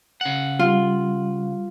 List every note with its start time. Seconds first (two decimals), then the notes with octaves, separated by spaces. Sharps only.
0.21 C#3 F#5
0.59 G3 F4